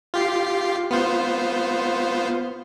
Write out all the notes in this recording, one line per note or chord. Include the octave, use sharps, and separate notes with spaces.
F4 G4 C7
B3 F4 C5